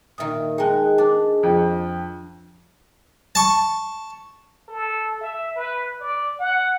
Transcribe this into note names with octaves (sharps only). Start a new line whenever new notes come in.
A#2 D#3 D#5 E5 D#6
G#3 D#4 G#4 D#5 G5 A5 F#6
D4 A5
F2
A5 C#6
A4
E5
B4
D5
F#5